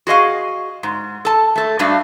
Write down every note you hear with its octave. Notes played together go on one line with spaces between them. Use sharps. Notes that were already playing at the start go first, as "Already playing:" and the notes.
F#4 G#4 D#5 F5
G#2
A4 A5
A3 A4
G2 G3 A3 D4 F#4 F5